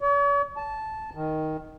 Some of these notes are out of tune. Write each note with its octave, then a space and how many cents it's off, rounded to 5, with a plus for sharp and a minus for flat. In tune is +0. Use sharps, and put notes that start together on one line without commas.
C#5 +45
A5 -10
D#3 +5